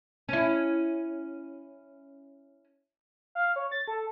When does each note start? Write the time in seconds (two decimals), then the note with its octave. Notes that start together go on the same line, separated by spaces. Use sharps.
0.29 C#4 E4
3.35 F5
3.56 C#5
3.72 A6
3.88 A4